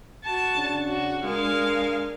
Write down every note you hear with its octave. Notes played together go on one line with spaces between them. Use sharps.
F#4 A5
C#3 D4
F#4
G#3 D4 A#4 F5